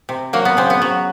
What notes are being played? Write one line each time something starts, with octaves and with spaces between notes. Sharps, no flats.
C3
F#3 A#3
B3
C#3 C4
B3
F#3